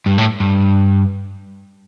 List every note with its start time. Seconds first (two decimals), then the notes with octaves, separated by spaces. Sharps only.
0.06 G2
0.18 A2
0.40 G2